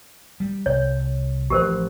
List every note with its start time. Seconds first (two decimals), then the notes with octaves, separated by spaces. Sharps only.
0.40 G3
0.66 C2 C#5
1.50 A1 F3 G4 A#4 C5